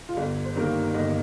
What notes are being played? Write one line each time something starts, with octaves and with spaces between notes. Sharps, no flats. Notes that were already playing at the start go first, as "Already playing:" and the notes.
F4
G1 G4
C5
G2 D#3 A#3 A#4
G1 D#5